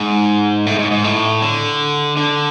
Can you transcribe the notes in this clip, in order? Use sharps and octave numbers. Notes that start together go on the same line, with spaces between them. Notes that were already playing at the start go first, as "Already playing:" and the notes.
Already playing: G#2
A2
G#2
G#2
A2
D3
D3